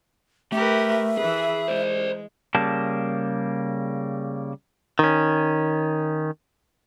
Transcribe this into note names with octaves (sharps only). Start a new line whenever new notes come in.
A3 G4 A#4 B4 E5
E3 G#4 B4
G#3 C5 D5
C#3 G3 A#3 A5
D#3 C#4